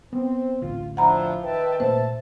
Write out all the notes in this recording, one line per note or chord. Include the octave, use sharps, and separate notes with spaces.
B3 C4
A1 D2 F4
F3 D4 E4 E5 F#5 A#5 B5
D#3 B4 E5 G5 A5
A#2 A3 A#3 C5 E5 A5